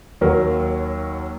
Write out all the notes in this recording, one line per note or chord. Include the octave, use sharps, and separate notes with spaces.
D#2 F#3 A#4